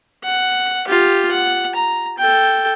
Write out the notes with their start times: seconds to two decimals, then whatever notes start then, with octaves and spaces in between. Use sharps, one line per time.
0.24 F#5
0.87 F4 G4
1.31 F#5
1.75 A#5
2.18 A4 G5